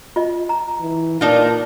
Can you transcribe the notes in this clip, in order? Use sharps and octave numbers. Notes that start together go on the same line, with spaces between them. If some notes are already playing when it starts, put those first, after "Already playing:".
F4 D#5
A#5
E3
A#2 D4 D#4 F4